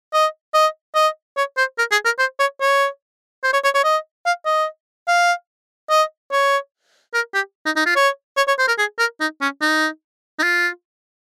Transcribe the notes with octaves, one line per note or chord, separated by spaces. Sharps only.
D#5
D#5
D#5
C#5
C5
A#4
G#4
A#4
C5
C#5
C#5
C5
C#5
C#5
C#5
D#5
F5
D#5
F5
D#5
C#5
A#4
G4
D#4
D#4
F4
C#5
C#5
C#5
C5
A#4
G#4
A#4
D#4
C#4
D#4
D#4
F4